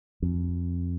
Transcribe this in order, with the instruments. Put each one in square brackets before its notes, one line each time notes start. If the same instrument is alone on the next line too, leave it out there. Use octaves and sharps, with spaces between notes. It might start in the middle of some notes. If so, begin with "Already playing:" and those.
[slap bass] F2